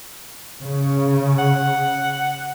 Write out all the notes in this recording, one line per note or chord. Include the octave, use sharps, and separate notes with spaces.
C#3
F#5